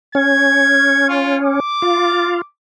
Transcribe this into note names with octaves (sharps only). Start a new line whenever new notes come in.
C#4 G#6
F4
D6
F4